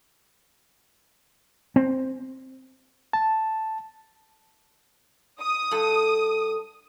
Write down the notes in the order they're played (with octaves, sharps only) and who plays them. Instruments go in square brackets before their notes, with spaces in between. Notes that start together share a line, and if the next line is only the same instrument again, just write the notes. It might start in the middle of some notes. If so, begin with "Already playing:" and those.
[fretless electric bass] C4
[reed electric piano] A5
[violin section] D#6
[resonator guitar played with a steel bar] G2 A4